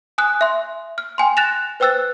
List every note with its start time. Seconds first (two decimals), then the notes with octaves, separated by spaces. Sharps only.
0.18 G#5 D#6 F#6
0.41 E5 C6
0.98 F6
1.18 G5 G#5 C6
1.37 F#6 A6 A#6 E7 F7
1.80 B4 C5 G5 E6 F#6 A6